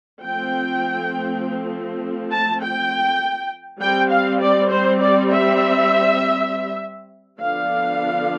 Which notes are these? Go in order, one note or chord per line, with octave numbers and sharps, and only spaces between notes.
F3 A3 C4 G5
A5
G5
G3 C4 G5
F5
D5
C5
D5
E5
D3 F3 B3 D4 F5